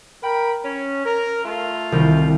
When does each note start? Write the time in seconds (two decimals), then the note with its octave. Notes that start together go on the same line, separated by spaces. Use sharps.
0.23 A#4 G5 B5
0.65 C#4
1.06 A#4
1.43 A3 F4
1.92 C2 D#3